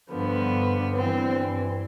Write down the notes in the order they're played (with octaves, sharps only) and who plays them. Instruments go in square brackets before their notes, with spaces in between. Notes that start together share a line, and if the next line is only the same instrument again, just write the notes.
[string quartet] G2 D3 F3 B3
G2 E3 C4